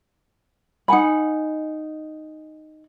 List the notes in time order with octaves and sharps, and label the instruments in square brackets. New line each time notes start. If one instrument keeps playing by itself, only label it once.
[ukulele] D#4 F#5 G#5 B5